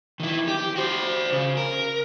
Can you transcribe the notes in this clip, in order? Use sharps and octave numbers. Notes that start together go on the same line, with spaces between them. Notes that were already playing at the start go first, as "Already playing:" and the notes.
D#3 E4
G4
F#4 C5
C#3
A#4